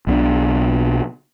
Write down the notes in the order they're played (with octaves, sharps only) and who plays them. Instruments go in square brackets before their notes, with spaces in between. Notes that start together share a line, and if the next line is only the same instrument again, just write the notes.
[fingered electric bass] B1 B2 F3 D4